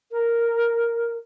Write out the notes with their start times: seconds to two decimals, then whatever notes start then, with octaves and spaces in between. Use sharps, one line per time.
0.12 A#4